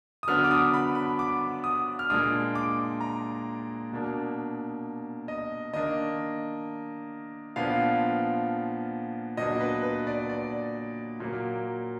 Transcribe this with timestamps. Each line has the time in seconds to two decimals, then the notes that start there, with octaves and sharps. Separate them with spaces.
0.23 D#6
0.27 D3 F#3 B3 D4 F6
0.44 D6
0.51 D#6
0.74 B5
0.95 B5
1.19 D6
1.64 D#6
1.99 F6
2.10 A#2 G#3 D4 D#6
2.55 D6
3.01 A#5
3.92 B2 A#3 D4
5.28 D#5
5.73 D#3 A#3 D4 D#5
7.56 A#2 F3 B3 D4 F5
9.37 A#2 F#3 B3 D4 D#5
9.60 B4
9.83 B4
10.07 D5
10.29 D5
11.20 A#2 F#3 A#3